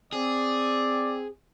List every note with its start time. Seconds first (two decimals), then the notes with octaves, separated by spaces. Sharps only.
0.13 C4 G#4 D5